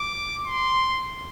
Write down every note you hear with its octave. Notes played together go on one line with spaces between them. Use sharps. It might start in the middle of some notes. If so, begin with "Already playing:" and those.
Already playing: D6
C6